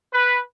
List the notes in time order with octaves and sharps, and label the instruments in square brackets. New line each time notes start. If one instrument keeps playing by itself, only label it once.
[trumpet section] B4